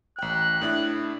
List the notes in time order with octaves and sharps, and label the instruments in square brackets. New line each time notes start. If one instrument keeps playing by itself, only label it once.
[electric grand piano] A1 G5 [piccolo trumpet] F#6
[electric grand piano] A2 D4 E4